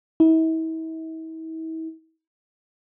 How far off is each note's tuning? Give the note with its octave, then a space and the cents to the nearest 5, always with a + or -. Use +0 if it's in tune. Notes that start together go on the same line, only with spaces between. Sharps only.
E4 -40